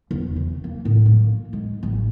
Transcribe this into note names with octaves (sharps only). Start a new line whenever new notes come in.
E1
C3
A#3
A2
A#3
G#3
A1